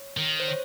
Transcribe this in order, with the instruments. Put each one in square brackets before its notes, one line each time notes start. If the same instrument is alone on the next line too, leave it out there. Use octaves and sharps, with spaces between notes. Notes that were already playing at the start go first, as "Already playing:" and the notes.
Already playing: [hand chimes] C#5
[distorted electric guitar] D#3
[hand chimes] C5
C#5